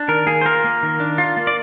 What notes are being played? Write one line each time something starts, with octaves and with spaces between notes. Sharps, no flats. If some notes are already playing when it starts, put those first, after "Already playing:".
Already playing: D4
D#3 A#4
A#3 G#4
C5
F4 A#4
A#3
D#3
D4
F4
A#3
D5